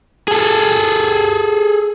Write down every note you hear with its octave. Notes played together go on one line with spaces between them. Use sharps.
G#4 A4